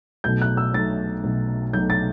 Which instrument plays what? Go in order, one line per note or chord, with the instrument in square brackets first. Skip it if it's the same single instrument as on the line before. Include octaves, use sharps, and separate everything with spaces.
[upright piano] B1 B2 A3 G6
F#6
E6
B1 B2 A3 A6
B1 B2 A3
B1 B2 A3 G6
A6